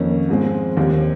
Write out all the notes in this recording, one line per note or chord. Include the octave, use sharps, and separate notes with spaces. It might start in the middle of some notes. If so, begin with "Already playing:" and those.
Already playing: F2 D#3 A#3 C#4
G#2 F3 G#3 C4
D#2 D#3 G3 C4